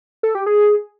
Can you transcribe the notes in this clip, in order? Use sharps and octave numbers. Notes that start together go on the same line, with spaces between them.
A4
G4
G#4